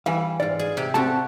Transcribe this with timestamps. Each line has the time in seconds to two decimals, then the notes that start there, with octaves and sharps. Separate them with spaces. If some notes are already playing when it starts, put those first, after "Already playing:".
0.06 E3 G3 F5 G#5
0.40 G#2 F4 D5
0.59 G#4
0.77 C3 G4
0.94 C4 F#4 G4 A4 A5